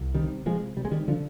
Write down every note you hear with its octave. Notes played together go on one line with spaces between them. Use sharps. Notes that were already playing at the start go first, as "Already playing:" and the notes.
Already playing: C2
C3 D#3 G3
C3 F3 G#3
C3 G3
G#3
D#3 G3
D3 F3